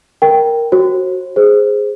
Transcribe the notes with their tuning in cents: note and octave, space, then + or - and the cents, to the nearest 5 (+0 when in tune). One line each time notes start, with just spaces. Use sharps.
A#4 +0 G5 +0
F#4 +5 C5 +45
G#4 +0 C5 +0